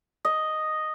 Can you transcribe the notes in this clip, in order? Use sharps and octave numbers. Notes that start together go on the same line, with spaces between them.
D#5